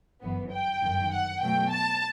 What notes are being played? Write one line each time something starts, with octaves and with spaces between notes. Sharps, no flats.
G1 F#2 E3 B3
G5
G1 F#2 D#3
F#5
B2 F#3 A3 G5
A5